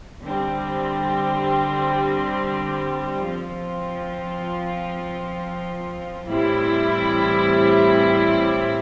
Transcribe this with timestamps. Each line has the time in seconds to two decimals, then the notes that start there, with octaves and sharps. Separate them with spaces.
0.22 D3 G3 C4
3.25 F3 C4 F4
6.28 A2 E3 G3 C4 E4